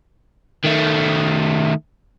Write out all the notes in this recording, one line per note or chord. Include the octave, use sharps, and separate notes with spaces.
D#3 A3